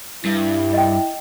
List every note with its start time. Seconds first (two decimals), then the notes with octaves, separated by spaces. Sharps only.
0.25 G2 E4
0.73 D#5 G5